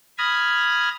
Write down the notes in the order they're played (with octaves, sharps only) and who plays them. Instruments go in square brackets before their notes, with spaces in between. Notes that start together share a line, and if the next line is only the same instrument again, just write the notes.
[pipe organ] B5 D#6 F6 G#6 A#6